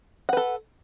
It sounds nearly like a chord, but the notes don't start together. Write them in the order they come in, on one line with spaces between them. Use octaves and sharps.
F#5 B4 A4